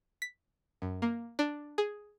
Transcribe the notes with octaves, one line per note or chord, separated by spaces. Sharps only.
B6
F#2
A#3
D4
G#4